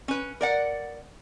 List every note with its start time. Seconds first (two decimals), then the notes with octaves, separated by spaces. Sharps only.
0.08 C#4 B4
0.41 A#4 D5 F#5